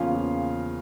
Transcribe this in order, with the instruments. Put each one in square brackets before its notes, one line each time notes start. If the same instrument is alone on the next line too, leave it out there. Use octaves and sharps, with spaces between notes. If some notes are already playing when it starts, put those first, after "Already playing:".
Already playing: [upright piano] E2 C#3 F3 A#3 C#4 F4 F5